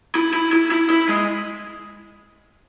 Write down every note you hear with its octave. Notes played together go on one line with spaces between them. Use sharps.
E4
E4
E4
E4
E4
G#3